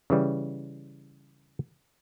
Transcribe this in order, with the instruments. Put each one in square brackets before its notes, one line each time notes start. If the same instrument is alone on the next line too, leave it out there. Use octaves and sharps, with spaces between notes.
[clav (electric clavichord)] C#3 E3 G3